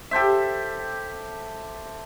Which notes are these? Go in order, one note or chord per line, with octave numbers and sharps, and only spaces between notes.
G4 A4 C5 E5